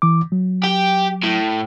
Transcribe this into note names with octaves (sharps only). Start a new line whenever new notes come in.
E3 D6
F#3
G4
A2